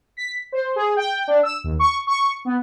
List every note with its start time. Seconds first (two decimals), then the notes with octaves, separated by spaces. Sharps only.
0.17 B6
0.52 C5
0.76 G#4
0.96 G5
1.27 D4
1.43 E6
1.64 D#2
1.79 C#6
2.07 C#6
2.45 B3